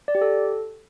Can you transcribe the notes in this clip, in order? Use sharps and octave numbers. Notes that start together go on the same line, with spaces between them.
D5
G4
A4